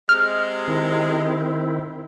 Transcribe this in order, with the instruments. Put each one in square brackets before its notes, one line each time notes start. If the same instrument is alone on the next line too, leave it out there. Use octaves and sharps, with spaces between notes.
[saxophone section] C3 G#3 [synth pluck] F6
[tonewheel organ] D#3 C4 E4